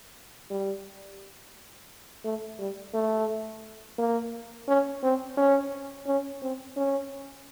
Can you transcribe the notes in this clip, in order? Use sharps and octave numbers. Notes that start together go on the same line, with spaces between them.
G3
A3
G3
A3
A#3
C#4
C4
C#4
C#4
C4
C#4